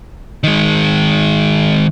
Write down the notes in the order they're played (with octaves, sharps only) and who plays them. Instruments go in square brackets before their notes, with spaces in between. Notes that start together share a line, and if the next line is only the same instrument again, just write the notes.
[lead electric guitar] D#3 G#3